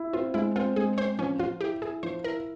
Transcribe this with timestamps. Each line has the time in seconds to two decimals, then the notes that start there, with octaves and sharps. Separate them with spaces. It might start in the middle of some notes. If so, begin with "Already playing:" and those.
Already playing: E4
0.13 C4 F4
0.34 G#3 E4
0.56 C4 F4
0.76 G#3 G#4
0.98 C4 C5
1.19 F3 C#4
1.39 F3 F4
1.61 E4 G4
1.82 E4 G#4
2.03 F3 C5
2.24 E4 A#4